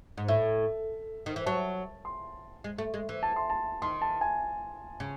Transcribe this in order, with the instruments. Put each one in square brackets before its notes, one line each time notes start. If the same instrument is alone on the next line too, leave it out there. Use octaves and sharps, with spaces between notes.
[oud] G#2
[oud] A2 [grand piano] E5
[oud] D#3
E3
[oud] F#3 [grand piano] A5
[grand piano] C6
[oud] G#3
A3
G#3
E3
[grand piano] A5
C6
A5
[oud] D#3 [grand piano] C6
[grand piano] A5
G#5
[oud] C#3